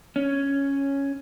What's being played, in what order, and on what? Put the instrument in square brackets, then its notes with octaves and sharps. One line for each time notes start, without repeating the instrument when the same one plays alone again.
[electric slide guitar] C#4